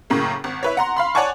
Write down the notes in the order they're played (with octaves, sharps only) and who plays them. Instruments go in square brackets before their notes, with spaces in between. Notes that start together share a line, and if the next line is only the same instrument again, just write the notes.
[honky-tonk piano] F#2 A2 C#3 A#3
G#1
E4 B4 C#5
F#5 A#5 C6
F5 B5 C6
C#5 D5 F#5 G#5 A5 C#6